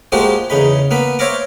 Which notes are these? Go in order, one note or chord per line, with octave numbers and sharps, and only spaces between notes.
F3 G#3 A#3 F#4 G4 C5
E2 C#3 D#4 B5
A#3 B3 B5
C5 C#5 E5 F5 A#5 D6